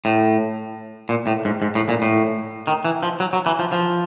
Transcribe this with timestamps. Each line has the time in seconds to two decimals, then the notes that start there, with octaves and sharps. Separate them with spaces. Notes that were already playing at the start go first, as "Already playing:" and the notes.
0.05 A2
1.09 A#2
1.27 A2
1.45 G#2
1.62 G#2
1.75 A2
1.89 A#2
2.02 A2
2.67 D#3
2.85 E3
3.03 F3
3.20 F#3
3.33 F#3
3.46 E3
3.59 F3
3.72 F3